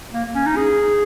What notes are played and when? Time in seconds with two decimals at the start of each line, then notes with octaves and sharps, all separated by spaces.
0.13 A#3
0.35 C#4
0.46 D#4
0.56 G#4